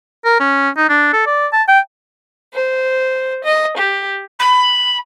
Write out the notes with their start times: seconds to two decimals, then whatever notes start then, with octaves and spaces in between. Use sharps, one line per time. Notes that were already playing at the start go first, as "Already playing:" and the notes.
0.25 A#4
0.40 C#4
0.77 D#4
0.89 D4
1.13 A4
1.26 D5
1.53 A5
1.68 G5
2.54 C5
3.44 D#5
3.78 G4
4.39 B5